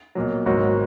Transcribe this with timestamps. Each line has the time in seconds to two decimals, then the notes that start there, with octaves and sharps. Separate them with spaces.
0.15 B1 A#2 F#3
0.46 G#1 G#2 F#3 F#4